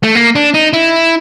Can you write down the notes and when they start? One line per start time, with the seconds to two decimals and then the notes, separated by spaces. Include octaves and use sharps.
0.03 A3
0.15 A#3
0.35 D4
0.54 D#4
0.73 E4